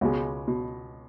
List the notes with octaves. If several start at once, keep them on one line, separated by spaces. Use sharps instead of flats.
C#2 B2 G#3
B2